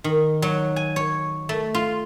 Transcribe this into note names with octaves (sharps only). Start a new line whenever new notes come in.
D#3
F#3
G#5
C#5
A3
F4